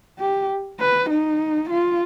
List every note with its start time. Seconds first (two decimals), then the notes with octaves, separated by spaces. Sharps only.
0.19 G4
0.79 B4
1.10 D#4
1.70 F4